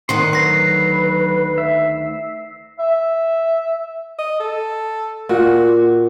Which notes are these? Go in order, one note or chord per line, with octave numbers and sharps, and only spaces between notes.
D2 D#3 F#5 C6
F#3 B4 A#6 C7
E5
E5
D#5
A4
A#2 F#4